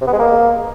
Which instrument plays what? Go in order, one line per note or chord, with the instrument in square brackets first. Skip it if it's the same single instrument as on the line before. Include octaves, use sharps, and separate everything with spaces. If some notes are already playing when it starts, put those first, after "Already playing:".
[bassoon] C3
B3
G#3
A#3